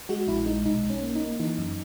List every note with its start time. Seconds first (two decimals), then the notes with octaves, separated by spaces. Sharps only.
0.09 G#3 F#4
0.27 A#1 E4
0.46 G#3 D#4
0.65 B1 D#4
0.83 B1
0.90 C#4
1.02 A#3
1.15 D#4
1.21 A#3
1.40 E3 D#4
1.58 F#2